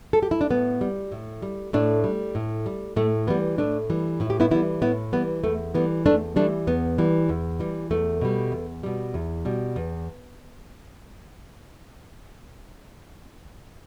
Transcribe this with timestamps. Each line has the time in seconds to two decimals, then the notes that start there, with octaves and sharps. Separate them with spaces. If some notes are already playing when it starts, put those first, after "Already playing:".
0.13 A4
0.23 G4
0.31 E4
0.41 D4
0.50 A2 B3
0.81 G3
1.12 A2
1.42 G3
1.73 A2 A3 D4
2.04 G3
2.35 A2
2.66 G3
2.96 A2 A3
3.27 E3 G3 B3
3.58 A2 A3 D4
3.90 E3 G3
4.20 A2 E4
4.30 G4
4.40 B3 E4
4.51 E3 G3 B3 E4
4.82 A2 B3 E4
5.13 E3 G3 B3
5.44 E2 A3
5.74 E3 G3 B3
6.05 E2 A3 D4
6.36 E3 G3 A3 D4
6.67 E2 B3
6.98 E3 G3
7.29 E2
7.60 E3 G3
7.91 E2 A3
8.21 B2 G3
8.52 E2
8.83 B2 G3
9.14 E2
9.45 B2 G3
9.76 E2